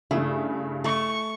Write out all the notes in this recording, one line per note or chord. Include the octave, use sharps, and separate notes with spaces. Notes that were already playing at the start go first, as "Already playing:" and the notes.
G2 C#3 A3 E4 G#4 E5
A3 C#6